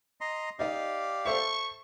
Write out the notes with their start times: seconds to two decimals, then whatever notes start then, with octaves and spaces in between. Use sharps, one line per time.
0.21 D#5 A#5 C6
0.59 D#4 G4 D5 D#5 F5
1.25 A4 C5 E5 C#6